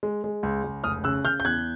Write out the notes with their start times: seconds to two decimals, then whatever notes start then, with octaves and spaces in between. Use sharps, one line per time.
0.03 G#3
0.24 G#3
0.43 C#2
0.64 C#2
0.84 F1 D#6 F6
1.04 C#3 E6 F#6
1.24 C#3 F6 G6
1.40 G6
1.44 E2 F#6 G#6